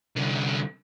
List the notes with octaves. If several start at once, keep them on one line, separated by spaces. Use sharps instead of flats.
C2 D3